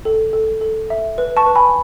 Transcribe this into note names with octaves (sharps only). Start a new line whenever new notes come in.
A4
A4
A4
E5
B4
A5 C#6
B4
G#5 B5